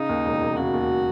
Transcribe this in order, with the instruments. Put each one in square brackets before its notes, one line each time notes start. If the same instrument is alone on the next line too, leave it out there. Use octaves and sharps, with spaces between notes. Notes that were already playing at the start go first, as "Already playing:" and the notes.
Already playing: [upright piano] C#3 [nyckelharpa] D#4
[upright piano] D#2
E1
E1
[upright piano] C#3 [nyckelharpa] F#4
[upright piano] D#2